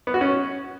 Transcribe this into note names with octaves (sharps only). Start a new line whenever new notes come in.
B3
F#4
C#4